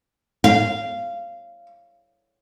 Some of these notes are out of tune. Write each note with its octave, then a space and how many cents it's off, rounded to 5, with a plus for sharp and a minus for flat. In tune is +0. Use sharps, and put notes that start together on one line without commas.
F5 -15